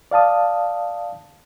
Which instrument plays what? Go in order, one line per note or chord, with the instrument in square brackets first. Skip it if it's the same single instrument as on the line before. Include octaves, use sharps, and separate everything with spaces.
[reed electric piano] D5 F5 A5 D#6